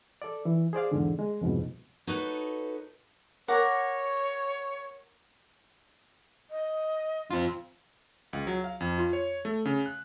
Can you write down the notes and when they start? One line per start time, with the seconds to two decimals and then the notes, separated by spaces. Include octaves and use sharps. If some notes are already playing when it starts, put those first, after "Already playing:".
0.22 A4 D5
0.45 E3
0.73 G#4 C5 D5 F5
0.92 E2 G#2 D3
1.19 G#3
1.41 C2 F2 G#2 B2
2.07 D#4 F#4 A4 B4 C#5
3.48 A#4 C#5 F#5 D6
6.50 D#5
7.31 C4 F4
8.33 C#2
8.47 F#3
8.64 F5
8.80 F2
8.98 F4
9.13 C#5
9.45 A3
9.65 C#3
9.86 F#6